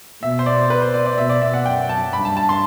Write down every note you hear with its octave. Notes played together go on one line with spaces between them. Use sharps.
B2 E5
C5
D5
B4
C5
D5
D5
B2 E5
D5
E5
F#5
F#2 G5
A5
G2 B5
A5
A5
C6